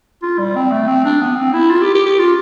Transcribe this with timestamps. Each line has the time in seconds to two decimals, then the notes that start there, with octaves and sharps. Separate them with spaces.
0.23 F4
0.39 G3
0.56 C4
0.72 A3
0.88 C4
1.05 D4
1.21 B3
1.36 C4
1.53 E4
1.70 F4
1.81 G4
1.95 G4
2.06 G4
2.19 F4